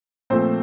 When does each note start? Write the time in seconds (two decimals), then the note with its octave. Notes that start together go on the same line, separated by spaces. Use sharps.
0.30 A#2 F3 A3 C4 C5